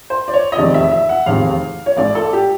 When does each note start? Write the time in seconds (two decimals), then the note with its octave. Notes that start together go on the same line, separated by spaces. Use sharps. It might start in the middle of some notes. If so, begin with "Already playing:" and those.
0.10 C5
0.28 D5
0.34 C#5
0.52 D#5
0.56 F1 E2 C3 D#3 G#3 D5
0.74 E5
0.91 E5
1.09 F#5
1.26 F1 E2 C3 D#3 G#3 F5
1.86 C#5
1.97 A1 G#2 E3 D5
2.15 A4
2.33 G4